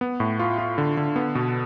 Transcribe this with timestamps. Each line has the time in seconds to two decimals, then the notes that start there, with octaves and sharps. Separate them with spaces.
0.01 B3
0.20 A2
0.39 F4
0.58 F4
0.78 D3
0.97 D3
1.16 B3
1.35 B2